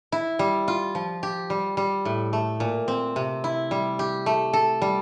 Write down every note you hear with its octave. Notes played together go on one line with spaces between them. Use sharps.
E4
G3
F4
F3
G4
G3
G3
A2
A3
A#2
C4
C3
E4
G3
G4
A3
A4
G3